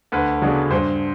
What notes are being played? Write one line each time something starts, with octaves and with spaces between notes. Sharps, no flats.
D2 B4
C#3 F#3 B3 D4
G2 C5